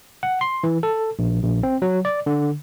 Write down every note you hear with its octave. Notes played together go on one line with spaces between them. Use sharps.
F#5
C6
E3
A4
A#1
A#1
C4
F#3
D5
D3